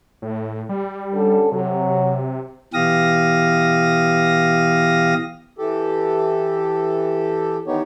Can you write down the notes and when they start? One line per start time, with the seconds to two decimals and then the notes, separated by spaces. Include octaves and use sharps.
0.22 A2
0.69 G3
1.14 D3 C#4 A4
1.52 C3 F#3
2.74 B2 E3 G4 F5 D#6 A#6
5.58 E3 G4 A4
7.67 D#3 E3 B3 D#4 G4 C#5